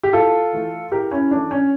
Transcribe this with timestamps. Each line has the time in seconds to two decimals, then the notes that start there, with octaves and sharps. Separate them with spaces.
0.03 G4
0.13 A2 F4 A4
0.53 E3 A3
0.92 A2 G4 A#4
1.11 C#4 E4
1.31 E3 A3 D4
1.51 C#4